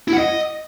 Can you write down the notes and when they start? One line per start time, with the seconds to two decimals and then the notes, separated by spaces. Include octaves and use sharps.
0.08 E4
0.13 F#5
0.18 D#5